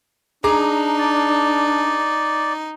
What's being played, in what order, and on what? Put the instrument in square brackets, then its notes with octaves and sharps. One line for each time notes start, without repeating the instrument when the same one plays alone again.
[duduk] D4 [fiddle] D#4 [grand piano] G#4 A#5 D6
[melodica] D5